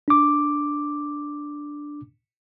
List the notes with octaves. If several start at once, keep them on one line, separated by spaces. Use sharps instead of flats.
D4 D6